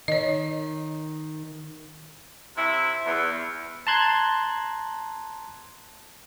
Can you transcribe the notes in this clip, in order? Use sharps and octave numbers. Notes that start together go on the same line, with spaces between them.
D#3 C#5 D#5
C3 E4
E2
A5 A#5 C6 F#6 G#6